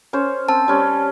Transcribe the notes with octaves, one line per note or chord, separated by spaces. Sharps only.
C#4 C5
C4 A5
G3 C#4